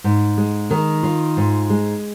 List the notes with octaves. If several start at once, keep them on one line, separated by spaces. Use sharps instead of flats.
G#2
G#3
D#3
F4
G#2
G#3